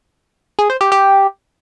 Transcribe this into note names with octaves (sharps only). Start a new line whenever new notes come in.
G#4
C5
G4
G4